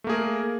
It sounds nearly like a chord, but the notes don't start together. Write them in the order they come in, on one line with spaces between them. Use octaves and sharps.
A3 A#3 G#4 A#4